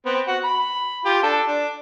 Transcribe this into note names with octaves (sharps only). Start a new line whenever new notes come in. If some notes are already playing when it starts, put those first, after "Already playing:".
B3 C4
F#4
B5
F4 G4
D4 A4 D5
D4